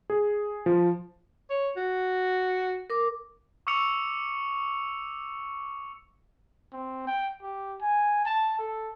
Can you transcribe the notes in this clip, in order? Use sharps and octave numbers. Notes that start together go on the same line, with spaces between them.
G#4
F3
C#5
F#4
A#4 D6
C#6 D6 E6 C#7 F7
C4
G5
G4
G#5
A5
A4